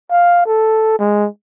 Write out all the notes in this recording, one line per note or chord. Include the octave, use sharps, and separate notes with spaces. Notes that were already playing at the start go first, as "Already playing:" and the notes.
F5
A4
G#3